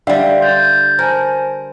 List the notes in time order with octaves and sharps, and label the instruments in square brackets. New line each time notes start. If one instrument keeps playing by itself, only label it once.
[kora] D3 G3 [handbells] E5 F5 G5
[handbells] C6 G6 A6
[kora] A#4 [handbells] C5 G#5 A5